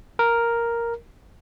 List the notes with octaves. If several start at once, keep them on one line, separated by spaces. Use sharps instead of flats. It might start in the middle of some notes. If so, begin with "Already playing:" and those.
A#4